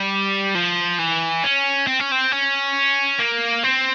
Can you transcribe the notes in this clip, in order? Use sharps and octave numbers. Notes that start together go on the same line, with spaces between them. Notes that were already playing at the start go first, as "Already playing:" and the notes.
Already playing: G3
F3
E3
C#4
C4
C#4
C4
C#4
A#3
C4